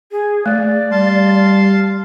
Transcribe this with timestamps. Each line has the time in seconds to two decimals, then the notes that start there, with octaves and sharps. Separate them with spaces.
0.11 G#4
0.46 A3 D5
0.91 G3 F5 A5 C6